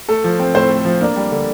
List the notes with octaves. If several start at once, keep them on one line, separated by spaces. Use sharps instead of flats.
A3 A4
F3
C4
A2 C4 C5
A3
F3
A#3 D4 D5
G3
D3